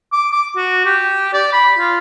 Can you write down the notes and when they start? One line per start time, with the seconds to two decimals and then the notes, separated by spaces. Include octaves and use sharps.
0.12 D6
0.31 D6
0.57 F#4
0.85 G4
1.33 D5
1.53 B5
1.79 F4